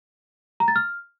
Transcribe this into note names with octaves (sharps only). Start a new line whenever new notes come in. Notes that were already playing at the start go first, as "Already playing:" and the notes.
A#5
A6
F6